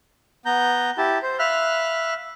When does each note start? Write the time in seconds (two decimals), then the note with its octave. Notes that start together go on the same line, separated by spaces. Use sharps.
0.46 B3 A#5 G6
0.98 E4 G4 A5
1.23 C5
1.39 E5 F5 B5 F6 F#6